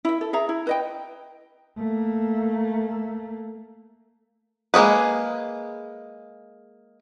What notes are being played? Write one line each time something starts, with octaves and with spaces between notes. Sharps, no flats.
E4 E5
A4
G#4 E5 A#5
E4
B4 D#5 G5
A3 A#3
G#3 A#3 C#4 G#4 B4